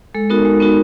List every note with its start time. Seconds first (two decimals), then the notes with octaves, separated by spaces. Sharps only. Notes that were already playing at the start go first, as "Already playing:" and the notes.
0.14 G#3 A4
0.30 B3 D#4 F#4 A#4
0.45 G#3
0.60 B3 D#4 F#4